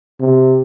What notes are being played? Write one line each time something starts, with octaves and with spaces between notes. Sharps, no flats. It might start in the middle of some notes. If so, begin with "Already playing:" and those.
C3